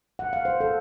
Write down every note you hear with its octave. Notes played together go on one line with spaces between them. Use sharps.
F#5
F5
C5
A4